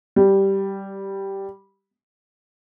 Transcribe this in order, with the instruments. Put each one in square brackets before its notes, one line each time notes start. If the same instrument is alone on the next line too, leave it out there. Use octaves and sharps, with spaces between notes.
[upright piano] G3